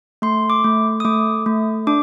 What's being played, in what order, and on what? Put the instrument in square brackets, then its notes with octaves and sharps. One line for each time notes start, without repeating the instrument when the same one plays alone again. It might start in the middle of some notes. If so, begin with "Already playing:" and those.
[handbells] A3 C6
D6
A3
D#6
A3 D6
A3
D4 D6